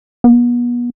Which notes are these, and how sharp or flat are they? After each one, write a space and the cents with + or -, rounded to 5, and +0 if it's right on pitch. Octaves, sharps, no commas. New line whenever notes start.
B3 -35